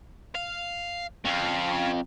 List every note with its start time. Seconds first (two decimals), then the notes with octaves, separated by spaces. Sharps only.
0.35 F5
1.25 F2 C#4 F5